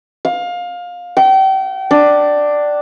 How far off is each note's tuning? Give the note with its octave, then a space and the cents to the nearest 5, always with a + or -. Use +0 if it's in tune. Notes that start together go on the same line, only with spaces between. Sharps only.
F5 +20
G5 -35
D4 +5